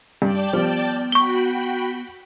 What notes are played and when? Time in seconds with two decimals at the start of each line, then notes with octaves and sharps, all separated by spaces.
0.22 G2 D5 G5 A5
0.53 F3 G3 B3
1.12 F#4 G5 B5 C#6 G7